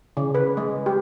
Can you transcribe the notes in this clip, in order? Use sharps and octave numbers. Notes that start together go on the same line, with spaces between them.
C#3
B4
G#3
G4